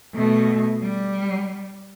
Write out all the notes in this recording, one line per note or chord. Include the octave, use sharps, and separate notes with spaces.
B2 A3
G3